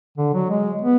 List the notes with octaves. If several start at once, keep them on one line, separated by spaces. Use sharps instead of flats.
D3
F#3
G#3
B3